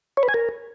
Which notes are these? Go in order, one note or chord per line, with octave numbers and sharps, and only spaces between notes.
C#5
B4
G#5
A#4